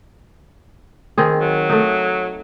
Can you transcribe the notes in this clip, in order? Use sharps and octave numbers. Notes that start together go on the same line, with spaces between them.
D#3 C4 G#4
F#3
A3 D#4